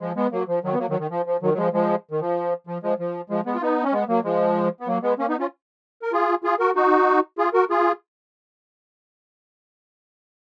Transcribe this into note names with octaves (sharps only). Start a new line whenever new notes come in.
F3 G#3
G#3 B3
F#3 A#3
F3
D#3 F#3
B3
F#3 A#3
D#3 F#3
D#3
F3
F3
D#3 F#3
F#3
F3 G#3
F3 G#3
D#3
F3
F3
F3 G#3
F3
F3 G#3
G#3 B3
F4
B3 D#4
C#4
G#3 B3
F#3 A#3
F3 G#3
B3
F#3 A#3
G#3 B3
A#3 C#4
B3 D#4
C#4 F4
A#4
F4 G#4
F4 G#4
F#4 A#4
D#4 F#4
F4 G#4
F#4 A#4
F4 G#4